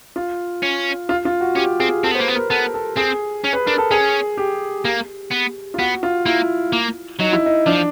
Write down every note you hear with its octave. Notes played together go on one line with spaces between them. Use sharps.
F4
C#4
F4
F4
F#4
C#4 G4
C4 G#4
C4 A4
B3
C5
A#3 B4
B3
A#4
B3 A4
A4
C4 G#4
C#4
B4
D4 A#4
A4
C#4 G#4
G4
A#3
B3
F4
B3 F#4
F4
A#3 E4
A#3
F#3 D#4
E4
D#4
F3 D4